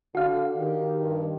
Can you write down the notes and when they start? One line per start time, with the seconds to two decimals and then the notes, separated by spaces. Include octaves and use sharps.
0.15 D3 F#4 F5
0.57 D#3 G4
0.99 G2